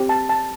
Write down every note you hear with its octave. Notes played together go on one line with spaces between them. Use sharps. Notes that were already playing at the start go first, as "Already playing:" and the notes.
Already playing: C4 G4
A5
A5